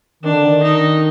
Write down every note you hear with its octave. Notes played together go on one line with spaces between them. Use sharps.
D#3 D4
D3
D#3
D#4